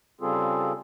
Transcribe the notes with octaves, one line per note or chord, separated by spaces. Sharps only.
C#3 G3 C4 F4 G#4 A4